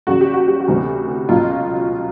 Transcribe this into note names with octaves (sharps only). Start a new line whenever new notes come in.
E2 C#3 F#3 F#4
G4
F#4
G4
F#4
D2 C3 E3
C#2 B2 F#3 F4